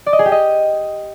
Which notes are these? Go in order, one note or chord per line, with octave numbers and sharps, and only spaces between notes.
D5
D#5
G#4
G4
D#5